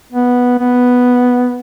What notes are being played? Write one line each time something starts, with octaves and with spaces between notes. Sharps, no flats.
B3
B3